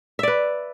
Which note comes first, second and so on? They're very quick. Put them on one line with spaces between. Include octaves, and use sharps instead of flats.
E5 D5 B4